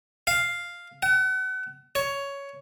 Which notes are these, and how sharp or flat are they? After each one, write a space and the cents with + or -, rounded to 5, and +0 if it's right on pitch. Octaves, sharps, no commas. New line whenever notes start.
F5 +0
F#5 +35
C#5 +10